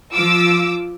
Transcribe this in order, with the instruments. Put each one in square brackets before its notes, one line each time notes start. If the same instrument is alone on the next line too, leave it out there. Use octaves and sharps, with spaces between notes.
[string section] F3 F4 D6 E6